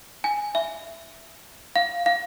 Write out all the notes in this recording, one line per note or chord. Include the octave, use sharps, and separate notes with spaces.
G#5
E5
F5
F5